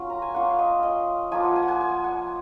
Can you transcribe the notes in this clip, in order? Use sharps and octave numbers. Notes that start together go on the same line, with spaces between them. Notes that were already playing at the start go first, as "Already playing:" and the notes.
Already playing: F#3 C#4 F4 C6
A#5
G#5
A#3 C#4 F4 F#5
F5
D#5
D#5
F3 A#3 F4 G#5
F#5
G#5
F#5
G#5
G#5
F#5